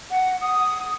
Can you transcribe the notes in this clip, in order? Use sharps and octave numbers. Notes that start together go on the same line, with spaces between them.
F#5
D#6